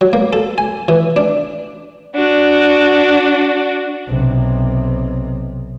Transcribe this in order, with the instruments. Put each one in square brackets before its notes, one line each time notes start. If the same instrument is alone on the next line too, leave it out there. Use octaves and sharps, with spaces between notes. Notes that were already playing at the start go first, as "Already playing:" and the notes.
[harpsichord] F#3
A#3
A4
G#5
E3
D4
[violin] D4 F#4
[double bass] B1 C3